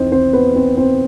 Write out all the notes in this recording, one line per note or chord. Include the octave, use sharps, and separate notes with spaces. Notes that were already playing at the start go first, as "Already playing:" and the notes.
Already playing: E2 C4 D#4 E4 C5 D#5
C4 C5
B3 B4
C4 C5
C4 C5